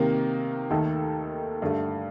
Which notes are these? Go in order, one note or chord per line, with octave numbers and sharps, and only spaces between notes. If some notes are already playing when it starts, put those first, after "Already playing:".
Already playing: C3 D#3 A#3
D#2 D#3 A3 D#4 A4
G2 D3 A3